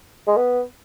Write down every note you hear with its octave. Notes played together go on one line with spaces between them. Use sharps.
G#3
B3